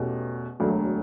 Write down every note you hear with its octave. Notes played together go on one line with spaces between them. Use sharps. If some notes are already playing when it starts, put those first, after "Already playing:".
Already playing: E2 B2 A3 C#4 G4
E1 D2 D3 F#3 A3